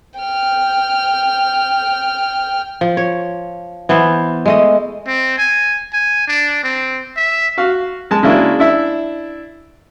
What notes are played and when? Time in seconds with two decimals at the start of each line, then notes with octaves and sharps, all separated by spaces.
0.20 G5 F6
2.81 F3
2.97 C#5
3.89 E3 B3 C5 E5
4.46 G#3 A3 D#5
5.07 C4
5.38 G#5
5.93 G#5
6.28 D4
6.63 C4
7.16 E5
7.58 F#4 F5
8.11 G#3 A5
8.23 C#3 G#3 A#3 D4 E4 F#4
8.59 D4 E4 E5